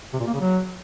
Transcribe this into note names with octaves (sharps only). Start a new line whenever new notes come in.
C3
A#2
A#3
C#3
F#3